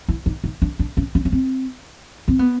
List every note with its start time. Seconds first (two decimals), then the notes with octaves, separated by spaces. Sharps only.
0.08 E4
0.26 D#4
0.44 D#4
0.62 D4
0.79 D4
0.97 C#4
1.15 C#4
1.25 C#4
1.32 C4
2.28 C4
2.39 B3